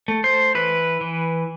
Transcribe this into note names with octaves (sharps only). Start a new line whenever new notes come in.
A3
C5
E3 B4
E3